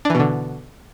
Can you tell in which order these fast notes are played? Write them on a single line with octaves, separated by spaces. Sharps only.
D4 E3 B2 D3